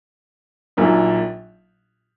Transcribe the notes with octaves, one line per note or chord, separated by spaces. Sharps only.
A#1 A#2 F#3 A#3 D#4